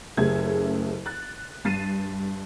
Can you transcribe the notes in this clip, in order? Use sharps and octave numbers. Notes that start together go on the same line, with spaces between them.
F#1 C#3 A3 G4 G#4 G#6
F#6 A6
G2 A6 C7 D#7 E7